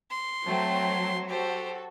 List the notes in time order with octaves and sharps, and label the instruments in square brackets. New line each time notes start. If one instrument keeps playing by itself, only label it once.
[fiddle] C6
[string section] F#3 [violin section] A3 C4 G5
[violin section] F#4 A4 [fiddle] G4 C5